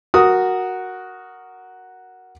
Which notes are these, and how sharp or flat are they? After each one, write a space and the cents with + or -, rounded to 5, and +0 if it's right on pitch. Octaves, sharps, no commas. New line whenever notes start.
F#4 +0 A#4 +0 D#6 +0